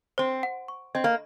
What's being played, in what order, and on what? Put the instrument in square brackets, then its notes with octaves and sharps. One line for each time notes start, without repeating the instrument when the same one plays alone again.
[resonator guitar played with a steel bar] C4 [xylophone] C5
[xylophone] F#5
C#6
[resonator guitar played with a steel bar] C4 [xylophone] D#5
[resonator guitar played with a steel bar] A#3